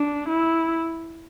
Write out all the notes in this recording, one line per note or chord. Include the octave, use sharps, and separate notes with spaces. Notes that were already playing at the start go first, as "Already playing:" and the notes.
Already playing: D4
E4